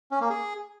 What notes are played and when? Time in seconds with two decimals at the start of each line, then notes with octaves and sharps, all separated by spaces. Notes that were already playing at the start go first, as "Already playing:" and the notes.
0.11 C#4
0.21 A#3
0.30 G#4